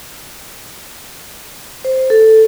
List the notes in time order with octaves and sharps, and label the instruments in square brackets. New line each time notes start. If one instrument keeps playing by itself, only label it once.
[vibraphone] C5
A4